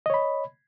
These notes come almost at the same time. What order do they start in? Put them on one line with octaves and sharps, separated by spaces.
D#5 C#5 B5